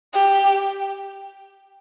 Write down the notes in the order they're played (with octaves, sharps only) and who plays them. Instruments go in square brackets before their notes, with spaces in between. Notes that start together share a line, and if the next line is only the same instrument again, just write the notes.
[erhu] G4